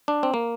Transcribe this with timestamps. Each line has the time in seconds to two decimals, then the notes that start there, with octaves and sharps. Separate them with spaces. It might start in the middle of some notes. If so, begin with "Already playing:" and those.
0.08 D4
0.23 C4
0.34 A#3